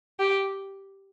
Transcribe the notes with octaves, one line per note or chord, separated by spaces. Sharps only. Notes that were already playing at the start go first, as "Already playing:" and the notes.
G4